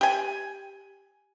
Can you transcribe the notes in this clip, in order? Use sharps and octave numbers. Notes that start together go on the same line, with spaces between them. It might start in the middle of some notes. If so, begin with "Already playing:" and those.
G4 G#5